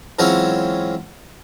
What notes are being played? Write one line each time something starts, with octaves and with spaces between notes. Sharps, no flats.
E3 F#3 G#3 C4 C#4 F4